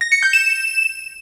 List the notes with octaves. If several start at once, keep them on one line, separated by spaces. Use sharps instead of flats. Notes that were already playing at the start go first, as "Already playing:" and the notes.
A#6
C#7
G6
E7